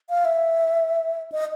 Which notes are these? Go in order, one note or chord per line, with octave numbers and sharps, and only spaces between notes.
F5
E5
D#5